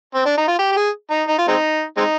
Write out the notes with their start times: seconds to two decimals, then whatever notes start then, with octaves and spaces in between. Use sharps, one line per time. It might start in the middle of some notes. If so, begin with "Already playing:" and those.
0.15 C4
0.26 D4
0.38 D#4
0.48 F4
0.59 G4
0.72 G4
0.77 G#4
1.10 D#4
1.28 D#4
1.38 F4
1.48 G#3 C4 D#4
1.97 G#3 C4 D#4